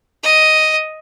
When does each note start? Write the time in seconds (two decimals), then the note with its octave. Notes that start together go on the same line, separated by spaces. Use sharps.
0.23 D#5